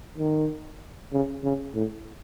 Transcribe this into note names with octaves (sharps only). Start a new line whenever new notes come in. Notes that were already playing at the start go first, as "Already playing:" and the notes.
D#3
C#3
C#3
A2